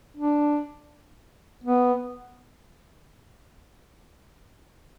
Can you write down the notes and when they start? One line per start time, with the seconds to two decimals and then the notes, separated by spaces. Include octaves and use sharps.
0.17 D4
1.64 B3